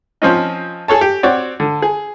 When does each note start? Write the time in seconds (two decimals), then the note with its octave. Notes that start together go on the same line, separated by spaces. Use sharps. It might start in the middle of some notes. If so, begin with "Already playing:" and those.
0.22 F3 C4 C#4 D#4
0.88 G#4 A4 C#5 A5
1.01 G4
1.23 C4 F#4 C#5 D5
1.60 D3
1.82 G#4